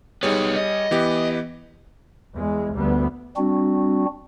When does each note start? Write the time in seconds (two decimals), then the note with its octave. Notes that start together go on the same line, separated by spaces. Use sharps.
0.23 G3 B3 D#4 G#4 C#5
0.56 D#5
0.91 E3 B3 G4
2.35 E2 G#3
2.75 D2 G3 B3
3.37 G3 C4 D4 F#4